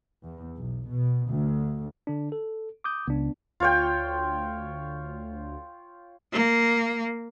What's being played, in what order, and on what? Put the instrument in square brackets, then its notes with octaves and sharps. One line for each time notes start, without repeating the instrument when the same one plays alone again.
[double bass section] E2
B1
B2
D2
[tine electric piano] D3 D4
A4
D6 D#6 G6
[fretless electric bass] C#2 [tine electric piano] B3 D4
[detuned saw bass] D2 [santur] F4 C#5 G5
[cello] A#3